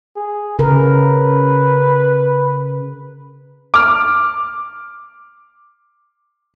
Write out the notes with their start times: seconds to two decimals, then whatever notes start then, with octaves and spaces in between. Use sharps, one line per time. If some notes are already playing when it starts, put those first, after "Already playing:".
0.16 G#4
0.59 C#3 A#4 B4
3.74 D6 F6